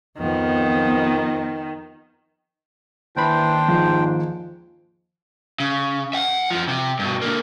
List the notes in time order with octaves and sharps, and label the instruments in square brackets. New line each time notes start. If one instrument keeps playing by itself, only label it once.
[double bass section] F2 F3 B3 [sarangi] D#3
[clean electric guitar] D#2 B5 [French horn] E3 [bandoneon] D4 C5 G5
[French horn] G#2 [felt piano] F3
[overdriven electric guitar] C#3
E5 F#5
F2 F3
C3
G2 B2
D3 A#3